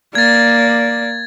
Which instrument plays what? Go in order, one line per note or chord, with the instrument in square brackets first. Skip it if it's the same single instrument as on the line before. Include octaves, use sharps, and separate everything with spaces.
[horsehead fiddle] A#3 D5 [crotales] G#6 A6